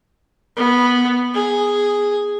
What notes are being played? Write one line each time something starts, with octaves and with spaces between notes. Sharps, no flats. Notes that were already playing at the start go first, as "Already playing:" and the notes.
B3
G#4